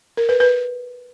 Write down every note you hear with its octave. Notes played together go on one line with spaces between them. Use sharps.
A#4
B4
B4